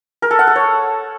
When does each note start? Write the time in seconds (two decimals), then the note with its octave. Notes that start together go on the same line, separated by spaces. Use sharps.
0.22 A#4
0.31 A4
0.39 F#5
0.47 A4
0.56 C#5